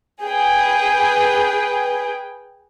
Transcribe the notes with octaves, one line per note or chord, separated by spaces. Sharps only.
G#4 B4 G5